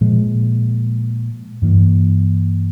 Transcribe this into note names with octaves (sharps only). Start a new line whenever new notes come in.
A#2 F3 G#3
G2 E3 A#3